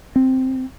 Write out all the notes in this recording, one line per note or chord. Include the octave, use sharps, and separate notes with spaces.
C4